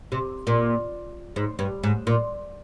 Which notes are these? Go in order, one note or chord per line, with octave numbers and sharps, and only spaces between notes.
C3
A#2
G#2
G2
G#2
A#2